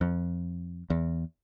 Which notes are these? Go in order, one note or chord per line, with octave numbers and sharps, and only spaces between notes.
F2
E2